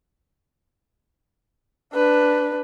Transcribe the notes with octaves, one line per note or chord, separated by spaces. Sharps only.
D4 B4